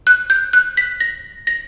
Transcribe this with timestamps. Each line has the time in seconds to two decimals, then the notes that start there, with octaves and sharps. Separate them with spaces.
0.07 F#6
0.30 G6
0.53 F#6
0.77 B6
1.00 A#6
1.47 A#6